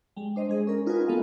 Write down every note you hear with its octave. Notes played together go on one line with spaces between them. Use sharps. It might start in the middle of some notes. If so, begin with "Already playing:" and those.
G3 G#3
D4 C5 D#5
G#3 G#4 D#5
C#4 A#4
D#4 F4 F#4 A#4 B4 G#5
A3 B3 A4 D#5 F5